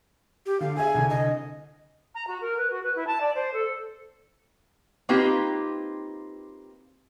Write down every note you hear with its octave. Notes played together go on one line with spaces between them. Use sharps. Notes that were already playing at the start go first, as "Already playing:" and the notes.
G4
D3 F5
G#4 E5 G#5
C2 D3
D#5
A#5
F#4
A#4
B4
F#4
B4
E4
A5
D5
C5
A4
A#3 C4 D#4 F4 G4 B4